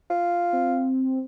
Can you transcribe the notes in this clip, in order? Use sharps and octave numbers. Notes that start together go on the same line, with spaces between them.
F4
C4